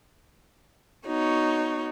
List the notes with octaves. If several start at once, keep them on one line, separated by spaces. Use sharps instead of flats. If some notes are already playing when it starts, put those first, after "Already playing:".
B3 D#4 F#4 C#5